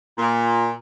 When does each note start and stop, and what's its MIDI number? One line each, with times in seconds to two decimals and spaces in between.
0.18 0.71 46